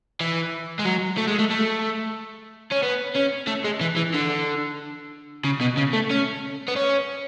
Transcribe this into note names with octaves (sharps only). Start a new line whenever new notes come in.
E3
G#3
F#3
A3
G#3
A3
A3
C#4
B3
C#4
A3
G#3
E3
E3
D3
C#3
B2
C#3
A3
C#4
B3
C#4